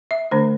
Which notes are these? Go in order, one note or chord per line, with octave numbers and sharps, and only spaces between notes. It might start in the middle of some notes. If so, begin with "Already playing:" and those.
E5
D3 A3 D4 C5